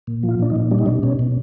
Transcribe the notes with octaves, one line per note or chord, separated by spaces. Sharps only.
A#2
F3
F4
A#2 D4
D#4
A#2
G3 D4
D#4
B2 D4
B2 C#4
B2